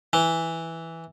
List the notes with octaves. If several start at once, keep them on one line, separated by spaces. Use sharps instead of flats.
E3